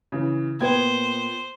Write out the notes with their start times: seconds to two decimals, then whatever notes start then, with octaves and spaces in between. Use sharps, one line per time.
0.12 C#3 E3
0.61 A#2 B3 C5 G5 G#6